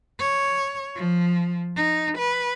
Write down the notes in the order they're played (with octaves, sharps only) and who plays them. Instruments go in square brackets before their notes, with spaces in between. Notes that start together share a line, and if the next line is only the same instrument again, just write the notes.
[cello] C#5
F3
D#4
B4